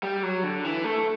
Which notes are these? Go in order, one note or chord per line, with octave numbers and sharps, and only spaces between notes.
G3
F#3
D3
E3
A3